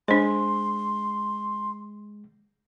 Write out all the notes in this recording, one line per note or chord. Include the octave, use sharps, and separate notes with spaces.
G#3 D4 C5 C6